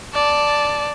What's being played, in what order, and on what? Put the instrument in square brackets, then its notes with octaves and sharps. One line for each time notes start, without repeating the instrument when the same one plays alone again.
[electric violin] D5 A5